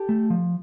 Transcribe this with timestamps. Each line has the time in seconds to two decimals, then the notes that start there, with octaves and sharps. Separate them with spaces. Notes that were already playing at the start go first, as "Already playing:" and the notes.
Already playing: G4 A4
0.09 A3
0.30 F3